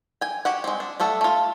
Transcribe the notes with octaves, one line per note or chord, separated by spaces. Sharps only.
G5 G#5
F#4 G4 F#5
G#3 C4
D4
G3 A3 A4 F#5
A3 F4